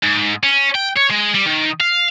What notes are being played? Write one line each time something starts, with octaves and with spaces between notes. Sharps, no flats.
G#2
C#4
G5
C#5
G#3
G3
D#3
F5